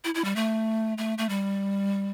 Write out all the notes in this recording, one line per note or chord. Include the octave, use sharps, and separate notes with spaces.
E4
E4
G3
A3
A3
A3
G3